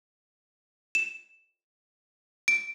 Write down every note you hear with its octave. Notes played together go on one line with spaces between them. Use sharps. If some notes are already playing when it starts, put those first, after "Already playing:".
E7
D7